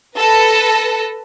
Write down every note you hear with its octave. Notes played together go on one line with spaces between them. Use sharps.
A4 B4 A#6